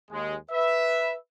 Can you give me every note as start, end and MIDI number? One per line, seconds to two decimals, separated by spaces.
0.11 0.35 39
0.11 0.35 56
0.51 1.15 71
0.51 1.15 76